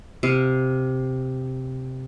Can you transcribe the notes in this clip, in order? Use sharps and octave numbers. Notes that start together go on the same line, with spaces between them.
C3 F5